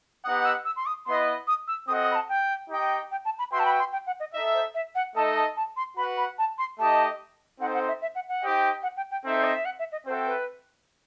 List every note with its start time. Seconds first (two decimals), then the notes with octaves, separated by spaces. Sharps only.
0.24 B3 D#4 G4 D#5 F#5 D#6
0.39 D#6
0.45 E6
0.65 E6
0.76 C6
0.86 D#6
1.06 B3 E4 B4 D#5 C6
1.47 D#6
1.68 E6
1.88 C4 F#4 A4 D#5 F#5 D#6
2.02 D#6
2.11 B5
2.15 A5
2.29 G5
2.70 D#4 G4 D#5 G5
3.11 G5
3.25 A5
3.39 B5
3.51 F#4 B4 E5 G5 C6
3.59 A5
3.65 B5
3.79 C6
3.92 G5
4.06 F#5
4.20 D#5
4.33 D#4 A4 D#5 E5
4.54 C5
4.74 E5
4.95 F#5
5.15 A3 D#4 A4 D#5 A5
5.36 A5
5.56 A5
5.76 C6
5.97 F#4 B4 F#5 B5
6.17 B5
6.38 A5
6.58 C6
6.79 A3 D#4 G4 D#5 A5
7.60 C4 D#4 A4 C5 F#5
7.74 F#5
7.88 E5
8.02 E5
8.15 F#5
8.29 F#5
8.42 D#4 G4 C5 D#5 G5
8.83 F#5
8.96 G5
9.11 G5
9.25 C4 D#4 A4 E5
9.33 C5
9.44 D#5
9.55 E5
9.65 F#5
9.79 E5
9.92 D#5
10.06 C4 F#4 A4 C5 E5 G5
10.26 B4